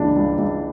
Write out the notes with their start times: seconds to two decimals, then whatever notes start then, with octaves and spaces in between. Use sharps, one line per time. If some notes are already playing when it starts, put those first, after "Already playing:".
Already playing: C#2 C#3 E3 D4
0.16 C#2
0.38 C#2